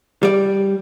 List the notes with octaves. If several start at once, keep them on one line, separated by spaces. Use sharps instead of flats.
G3 D5